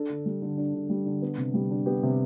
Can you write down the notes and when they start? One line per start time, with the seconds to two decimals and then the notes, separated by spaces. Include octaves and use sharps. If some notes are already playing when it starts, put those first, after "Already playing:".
Already playing: D4 A4
0.10 D3
0.26 G3
0.42 D3
0.58 D4
0.75 D3
0.90 G3
1.06 D3
1.22 B3
1.38 C3
1.54 G3
1.70 D4
1.86 B3 G4
2.03 C3